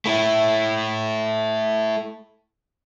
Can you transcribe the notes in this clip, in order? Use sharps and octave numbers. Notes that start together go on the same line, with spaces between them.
A3 E4